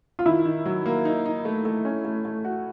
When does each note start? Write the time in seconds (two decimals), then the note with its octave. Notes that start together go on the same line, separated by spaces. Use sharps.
0.19 F4
0.26 D#3 E4
0.45 D#3
0.65 F#3
0.86 A#3
1.05 D#4
1.26 D#4
1.45 A3
1.65 A3
1.85 C#4
2.05 A3
2.25 A3
2.45 F#4